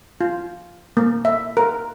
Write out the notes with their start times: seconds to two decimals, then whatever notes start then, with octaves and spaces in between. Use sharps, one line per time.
0.21 F4
0.97 A#3
1.25 E5
1.57 A#4